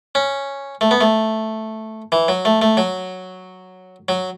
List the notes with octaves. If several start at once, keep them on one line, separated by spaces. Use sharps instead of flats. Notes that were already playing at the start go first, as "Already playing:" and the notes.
C#4
A3
B3
A3
E3
F#3
A3
A3
F#3
F#3